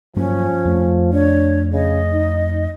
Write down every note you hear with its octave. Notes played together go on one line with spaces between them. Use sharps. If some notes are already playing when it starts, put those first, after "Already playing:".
G2 F3 F#3 A#3 C#4
F2 A3
D4 C#5
C#3 D#5
D#4